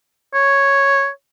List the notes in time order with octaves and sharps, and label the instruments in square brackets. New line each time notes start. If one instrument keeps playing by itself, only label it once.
[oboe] C#5